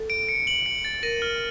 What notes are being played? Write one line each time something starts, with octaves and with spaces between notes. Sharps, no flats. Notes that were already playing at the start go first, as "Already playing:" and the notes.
Already playing: A4
D7
C#7
F#7
C#7
A6
A#4 D#7
F6